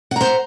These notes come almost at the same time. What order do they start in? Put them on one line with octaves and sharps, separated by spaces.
F#5 A#5 C5